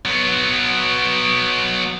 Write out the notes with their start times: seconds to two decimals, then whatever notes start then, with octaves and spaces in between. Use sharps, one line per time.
0.05 F#3 B3